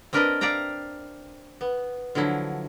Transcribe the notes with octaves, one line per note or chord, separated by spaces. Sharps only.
C4 D4 A#4 B4 D5 D#5
D5 E5 F5 G5 A#5
B3
D3 F3 F#3 E4